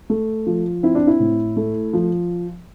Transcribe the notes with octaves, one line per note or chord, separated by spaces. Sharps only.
A3
F3
C4 E4
D4
E4
A2
A3
F3